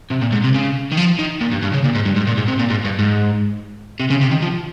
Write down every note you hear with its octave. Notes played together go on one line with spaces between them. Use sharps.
C3
A#2
G#2
C3
C#3
D#3
F3
D#3
A#2
G2
G2
C#3
A#2
G#2
G2
G#2
A#2
G#2
C3
A#2
G#2
G2
G#2
C3
C#3
C3
D#3
F3